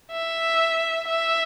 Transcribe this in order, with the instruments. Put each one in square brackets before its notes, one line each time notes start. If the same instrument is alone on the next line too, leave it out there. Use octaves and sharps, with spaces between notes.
[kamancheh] E5
E5